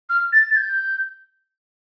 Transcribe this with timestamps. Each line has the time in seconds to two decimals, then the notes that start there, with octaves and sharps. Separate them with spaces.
0.09 F6
0.33 A6
0.50 A6
0.57 G6